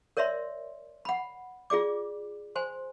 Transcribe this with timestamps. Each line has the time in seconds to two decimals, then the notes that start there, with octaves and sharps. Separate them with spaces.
0.17 A#4 C#5 D5 E5 C6
1.05 F#5 B5
1.70 F4 G#4 D5 D6
2.56 C5 G#5 C6